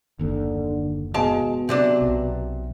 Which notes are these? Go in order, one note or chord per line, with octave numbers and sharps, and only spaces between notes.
F#1 D#2 D3
B2 G#3 F5 A5
C3 F#3 D4
B1